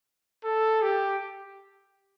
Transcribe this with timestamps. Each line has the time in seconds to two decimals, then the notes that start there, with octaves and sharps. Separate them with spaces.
0.44 A4
0.82 G4